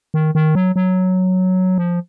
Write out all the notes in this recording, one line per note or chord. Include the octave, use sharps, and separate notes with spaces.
D#3
D#3
F#3
F#3
F3